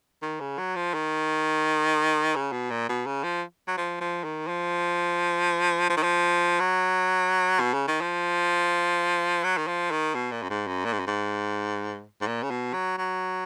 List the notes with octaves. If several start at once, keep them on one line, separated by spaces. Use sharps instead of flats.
D#3
C#3
F#3
F3
D#3
C#3
B2
A#2
B2
C#3
F3
F#3
F3
F3
D#3
F3
F3
D#3
F3
F#3
B2
C#3
D#3
F3
F#3
D#3
F3
D#3
B2
A#2
F#2
G#2
F#2
A#2
G#2
F#2
G#2
G#2
A#2
C#3
B2
F#3
F#3